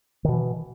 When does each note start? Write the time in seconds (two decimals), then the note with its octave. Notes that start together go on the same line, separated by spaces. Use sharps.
0.25 D#3
0.28 B2
0.32 E3